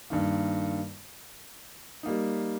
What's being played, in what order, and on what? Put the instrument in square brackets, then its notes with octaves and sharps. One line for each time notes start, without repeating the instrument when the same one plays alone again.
[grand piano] G2 D#3 A#3
G3 A#3 D#4